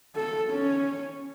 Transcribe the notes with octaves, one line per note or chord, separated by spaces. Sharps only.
A4
C#4